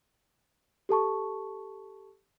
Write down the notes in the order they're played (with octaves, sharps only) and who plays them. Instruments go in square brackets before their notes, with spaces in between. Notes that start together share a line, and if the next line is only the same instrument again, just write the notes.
[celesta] G4 A4 A5 C#6